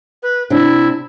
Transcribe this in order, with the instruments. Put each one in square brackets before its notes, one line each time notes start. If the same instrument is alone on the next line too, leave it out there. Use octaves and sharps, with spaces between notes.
[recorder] B4
[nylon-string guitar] C3 D4 [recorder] E4